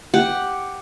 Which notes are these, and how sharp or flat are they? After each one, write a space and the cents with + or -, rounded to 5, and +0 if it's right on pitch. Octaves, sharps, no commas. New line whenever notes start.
G4 +0 F#5 +0